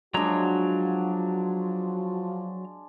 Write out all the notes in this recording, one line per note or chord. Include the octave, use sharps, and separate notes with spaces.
F3 F#3 G#3 D4 F4 F#4 C#5 A#5